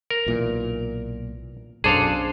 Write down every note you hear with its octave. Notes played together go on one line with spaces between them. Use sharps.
A#4
B1 A#2 E3
B1 F#2 D4 G#4 A4 C5 F5 D6